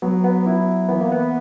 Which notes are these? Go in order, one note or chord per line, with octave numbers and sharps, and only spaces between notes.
F#3 B3
B3
E4
E3 B3
A#3
B3